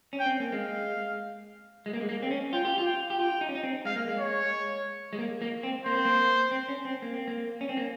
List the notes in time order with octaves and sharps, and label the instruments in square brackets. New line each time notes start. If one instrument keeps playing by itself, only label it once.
[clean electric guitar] C#4
[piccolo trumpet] G5
[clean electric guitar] C4
A#3
[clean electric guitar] G#3 [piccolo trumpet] F5
[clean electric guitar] G#3
A#3
G#3
A#3
C4
C#4
[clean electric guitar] F4 [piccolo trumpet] G5
[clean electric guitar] G4
F4
[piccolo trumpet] G5
[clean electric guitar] G4
[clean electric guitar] F4 [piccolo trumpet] G5
[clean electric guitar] D#4
C#4
D#4
C4
[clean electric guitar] G#3 [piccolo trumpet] F5
[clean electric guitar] A#3
G#3
[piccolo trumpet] C#5
[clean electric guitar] G#3
A#3
A#3
C4
[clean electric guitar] A#3 [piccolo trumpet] C5
[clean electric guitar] C4
A#3
C4
C#4
C4
A#3
C4
A#3
C#4
C4
A#3